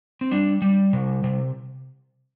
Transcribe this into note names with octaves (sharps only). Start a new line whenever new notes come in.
C4
G3 D4
G3
C3
C3